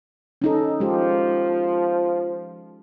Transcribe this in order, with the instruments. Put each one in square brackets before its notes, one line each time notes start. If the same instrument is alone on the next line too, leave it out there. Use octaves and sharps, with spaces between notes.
[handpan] C#4 D#4 A4
[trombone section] F3 [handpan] G#3 G4